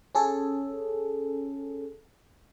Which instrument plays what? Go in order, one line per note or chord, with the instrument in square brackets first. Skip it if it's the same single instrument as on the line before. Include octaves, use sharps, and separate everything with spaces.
[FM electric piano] C#4 G#4 A4